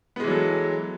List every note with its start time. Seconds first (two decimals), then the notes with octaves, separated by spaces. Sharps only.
0.16 B3
0.20 G#3
0.24 E3
0.27 F#3
0.31 A4